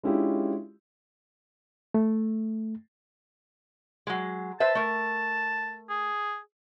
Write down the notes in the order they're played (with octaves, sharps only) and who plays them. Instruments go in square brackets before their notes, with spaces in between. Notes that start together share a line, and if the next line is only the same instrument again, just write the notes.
[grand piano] G#3 C#4 D4 E4 F4 G4
[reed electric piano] A3
[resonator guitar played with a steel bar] F#3 G#3
[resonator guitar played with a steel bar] B4 C5 E5 [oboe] A5
[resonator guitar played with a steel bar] A3 A#4
[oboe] G#4